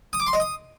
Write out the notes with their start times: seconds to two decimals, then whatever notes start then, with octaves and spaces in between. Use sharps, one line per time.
0.13 D#6
0.20 D6
0.27 C6
0.33 D#5
0.40 D#6